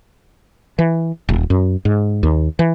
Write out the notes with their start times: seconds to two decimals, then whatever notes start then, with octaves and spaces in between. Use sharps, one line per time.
0.79 E3
1.29 D#1
1.50 F#2
1.85 G#2
2.23 D#2
2.59 E3